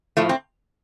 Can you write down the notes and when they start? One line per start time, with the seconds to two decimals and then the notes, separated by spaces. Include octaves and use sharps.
0.17 A2 F3 A3
0.29 C4